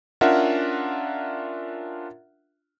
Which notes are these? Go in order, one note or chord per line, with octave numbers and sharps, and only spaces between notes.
C#4 D4 F4 A#4 E5 F#5